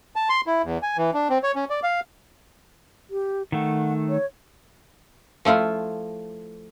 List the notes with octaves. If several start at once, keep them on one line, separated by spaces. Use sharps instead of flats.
A5
C6
E4
E2
G#5
E3
D4
C4
C#5
C#4
D5
F5
G4
D#3 A3 F#5
C#5
F3 A3 E4 F4